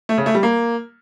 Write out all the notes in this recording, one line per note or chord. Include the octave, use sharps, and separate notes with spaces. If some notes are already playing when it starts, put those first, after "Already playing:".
A3
C#3
A3
G3
A#3